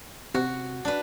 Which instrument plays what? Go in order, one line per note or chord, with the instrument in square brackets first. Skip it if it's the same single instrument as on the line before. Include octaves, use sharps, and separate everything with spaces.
[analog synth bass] C3 [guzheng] F#4
[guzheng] D4 B4